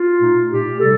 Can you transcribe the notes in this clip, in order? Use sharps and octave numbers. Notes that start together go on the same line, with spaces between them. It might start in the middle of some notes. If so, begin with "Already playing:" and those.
Already playing: F4
A#2 A3 D#4
A#2 A3 D#4 G4
C3 G3 A4